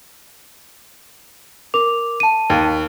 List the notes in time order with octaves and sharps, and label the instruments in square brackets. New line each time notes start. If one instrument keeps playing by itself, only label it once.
[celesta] A#4 D6 F7
A5 D#7
[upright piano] D#2